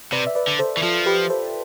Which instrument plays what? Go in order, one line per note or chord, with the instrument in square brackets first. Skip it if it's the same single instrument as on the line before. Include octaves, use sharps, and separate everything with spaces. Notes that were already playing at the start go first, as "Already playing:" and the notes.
[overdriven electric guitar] C3 [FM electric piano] B4 D5
[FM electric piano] E5
B4 D5
[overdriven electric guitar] D3
[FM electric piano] A4 C5
[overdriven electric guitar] E3
[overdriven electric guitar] F3 [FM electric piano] F4 A4
[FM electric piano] G4 B4
A4 C5